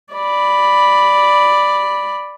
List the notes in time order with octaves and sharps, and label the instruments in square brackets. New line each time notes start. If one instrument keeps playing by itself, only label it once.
[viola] D5 B5